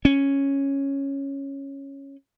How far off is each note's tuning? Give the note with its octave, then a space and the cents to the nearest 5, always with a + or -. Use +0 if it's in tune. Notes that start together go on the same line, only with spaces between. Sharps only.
C#4 -5